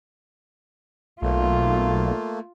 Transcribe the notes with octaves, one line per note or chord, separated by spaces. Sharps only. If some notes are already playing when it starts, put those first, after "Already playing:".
B1 A3 A#3 F4